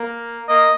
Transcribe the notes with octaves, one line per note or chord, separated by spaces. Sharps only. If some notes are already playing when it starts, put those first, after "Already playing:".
Already playing: A#3
A#3 D#5